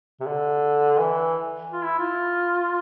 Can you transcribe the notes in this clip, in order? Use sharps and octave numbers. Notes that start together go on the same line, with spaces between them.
C3
D3
E3
F4
E4
F4